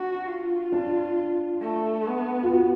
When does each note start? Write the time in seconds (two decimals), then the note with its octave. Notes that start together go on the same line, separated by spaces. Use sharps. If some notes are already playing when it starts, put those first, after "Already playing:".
Already playing: D4 F#4
0.27 F4
0.72 D4
1.62 A3
2.07 B3
2.43 F4
2.52 F#4